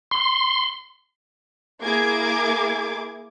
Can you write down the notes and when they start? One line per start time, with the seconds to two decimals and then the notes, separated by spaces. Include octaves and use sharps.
0.11 C6
1.84 A#3 E4 G#4 D6 G#6